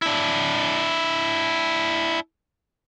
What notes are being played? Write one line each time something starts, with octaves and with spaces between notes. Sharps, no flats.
D4 E4